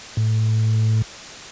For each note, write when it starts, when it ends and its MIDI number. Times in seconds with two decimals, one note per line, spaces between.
0.17 1.02 45